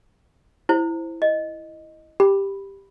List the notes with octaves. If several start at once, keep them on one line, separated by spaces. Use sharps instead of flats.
E4 C5
D#5
G4 B5